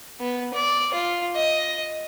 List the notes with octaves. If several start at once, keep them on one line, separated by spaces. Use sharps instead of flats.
B3
D5
F4
D#5